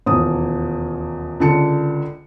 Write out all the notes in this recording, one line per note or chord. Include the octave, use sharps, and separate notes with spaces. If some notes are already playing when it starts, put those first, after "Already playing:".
D#1 E2 B2 D#6
C#2 D3 A5 C#7